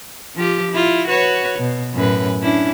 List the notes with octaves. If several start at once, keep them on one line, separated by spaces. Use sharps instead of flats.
F3 F4 G4
E4 F4
F#4 B4 C#5
B2
F#2 A2 B4
C#4 D4 E4